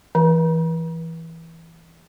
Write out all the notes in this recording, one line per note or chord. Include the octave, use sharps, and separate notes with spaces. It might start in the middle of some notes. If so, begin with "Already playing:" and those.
E3